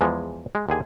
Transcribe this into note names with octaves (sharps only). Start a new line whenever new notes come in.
E2 E3 F3 G#3
G#3
D#2 D3 G#4 G#5